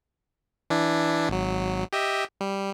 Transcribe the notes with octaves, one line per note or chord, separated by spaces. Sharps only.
E3 D4 E4
G#1 F#3
G4 D#5 E5
G3